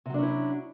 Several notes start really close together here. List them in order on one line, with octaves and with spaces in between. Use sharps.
C3 F#3 D4 C#4 E4